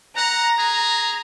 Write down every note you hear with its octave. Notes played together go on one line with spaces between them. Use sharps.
F#5 A#5
G#4